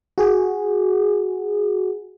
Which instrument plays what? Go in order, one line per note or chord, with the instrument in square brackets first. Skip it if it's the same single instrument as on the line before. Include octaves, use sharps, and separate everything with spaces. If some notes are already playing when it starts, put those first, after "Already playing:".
[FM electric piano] F#4 G#4